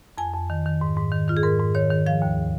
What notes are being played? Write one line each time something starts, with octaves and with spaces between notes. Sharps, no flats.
F2 G#5
F2
D#3
D#3
G#2
G#2
D#3
D#3 F4
G#4
G#2 A#4
G#2
D#3 C#5
D#3
F3 F5
D#2